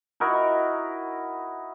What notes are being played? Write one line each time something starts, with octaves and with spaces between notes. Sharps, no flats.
D#4 E4 F#4 A#4